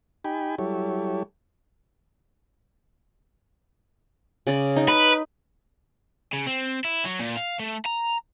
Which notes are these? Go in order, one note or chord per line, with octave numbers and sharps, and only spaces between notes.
D#4 G4 G5 G#5 B5
F#3 G3 E4 G4 A4 C#5
C#3 D5 B5
D#4
B4
C#3
C4
E4
F#3
A#2
F5
A3
A#5